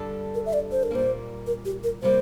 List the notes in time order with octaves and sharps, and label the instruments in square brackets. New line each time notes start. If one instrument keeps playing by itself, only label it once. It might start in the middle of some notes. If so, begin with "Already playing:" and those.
Already playing: [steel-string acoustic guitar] G2 D3 G3 D4 A4
[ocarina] A#4
E5
D5
C5
A#4
[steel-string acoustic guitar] A#2 G3 A#3 [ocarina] C5
[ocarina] A#4
G4
A#4
[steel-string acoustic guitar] C3 G3 A#3 [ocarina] C5